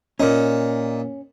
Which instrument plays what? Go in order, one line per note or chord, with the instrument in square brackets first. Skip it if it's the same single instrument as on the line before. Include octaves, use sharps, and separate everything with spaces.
[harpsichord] A#2 D#4 [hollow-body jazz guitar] C#4